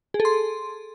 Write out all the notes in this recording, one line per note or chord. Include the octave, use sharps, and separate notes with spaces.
G#4
A4
C6